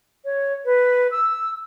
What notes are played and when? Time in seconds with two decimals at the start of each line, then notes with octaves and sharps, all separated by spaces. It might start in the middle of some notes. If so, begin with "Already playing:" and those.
0.25 C#5
0.65 B4
1.11 E6